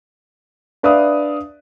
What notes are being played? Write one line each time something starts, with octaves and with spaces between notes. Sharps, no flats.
D4 B4 D5 E5 F5 D#6